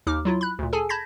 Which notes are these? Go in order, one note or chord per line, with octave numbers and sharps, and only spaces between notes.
D#2 D#4 D6 F6
F#3 E4 F4
B5 F#6
D2 A#2
G#4 A4 G#5 A5
A5 B5 G6 G#6 A#6 B6